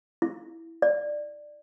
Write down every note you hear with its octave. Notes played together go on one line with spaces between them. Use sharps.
E4
D5